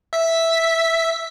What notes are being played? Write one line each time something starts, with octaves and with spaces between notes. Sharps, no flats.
E5 B6